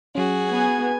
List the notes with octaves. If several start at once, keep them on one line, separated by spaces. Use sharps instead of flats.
F#3 C#4 F#4 G#4
B3 G#5